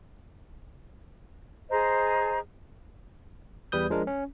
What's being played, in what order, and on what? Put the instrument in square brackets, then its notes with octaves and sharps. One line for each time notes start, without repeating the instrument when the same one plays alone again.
[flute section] G#4 C5 D#5 A#5
[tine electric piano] E2 G3 B4 D#6 G6
F3 G#3 D4 A#4
C#4